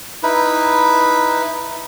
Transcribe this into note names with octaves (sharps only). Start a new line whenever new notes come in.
D#4 E4 B4